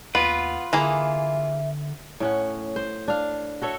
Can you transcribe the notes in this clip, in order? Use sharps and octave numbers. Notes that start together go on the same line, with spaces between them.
D#2 B3 F4 B4
D3 E3 A#3 G#4 E5
A2 C#4 F#5
C5
D4 F5
F#4 A4 C#5 E5